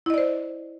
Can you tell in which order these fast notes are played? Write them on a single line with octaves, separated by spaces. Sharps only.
E4 D#5 D5 C5